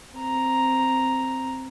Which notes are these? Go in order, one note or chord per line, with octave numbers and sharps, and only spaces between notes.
C4 A#5